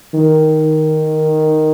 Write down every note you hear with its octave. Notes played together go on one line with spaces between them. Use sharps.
D#3